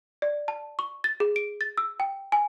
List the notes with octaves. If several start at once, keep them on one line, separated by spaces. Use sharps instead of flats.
D5
A5
C#6
A6
G#4
D7
A6
E6
G5
G#5